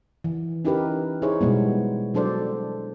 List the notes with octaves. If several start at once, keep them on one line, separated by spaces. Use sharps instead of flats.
E3
C#4 D#4 E4 G4 A#4 B4
D#4 E4 G#4 C5 C#5
B2 G3 G#3 B3
F#3 D4 A4 C5 D5